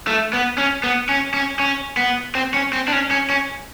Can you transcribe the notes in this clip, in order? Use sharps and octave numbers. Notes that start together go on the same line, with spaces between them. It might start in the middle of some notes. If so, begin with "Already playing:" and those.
A3
B3
C#4
B3
C#4
C#4
C#4
B3
C4
C#4
C4
D4
C#4
C#4
C#4